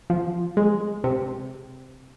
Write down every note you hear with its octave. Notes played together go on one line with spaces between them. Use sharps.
F3
G#3
C3